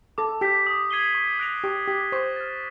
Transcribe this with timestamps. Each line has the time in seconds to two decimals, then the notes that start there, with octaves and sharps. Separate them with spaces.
0.18 A4 D6
0.41 G4 G6 B6
0.67 D#6
0.91 G#6 C7 D#7 G7
1.15 C#6
1.39 F#6 A#6 D7 F7
1.64 G4 C#6
1.88 G4 F#6 B6
2.12 C5 C#6
2.36 F6 A6